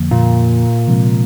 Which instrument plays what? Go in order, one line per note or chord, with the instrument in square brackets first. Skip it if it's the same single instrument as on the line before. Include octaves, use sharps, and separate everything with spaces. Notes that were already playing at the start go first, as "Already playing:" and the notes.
Already playing: [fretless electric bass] F2 D3 F3 A#3
[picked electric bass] A#2
[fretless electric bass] C3 F3 G#3 C4